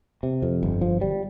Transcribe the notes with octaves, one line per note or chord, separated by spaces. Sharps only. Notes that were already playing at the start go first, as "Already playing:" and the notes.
C3
F2
G1
F3
G3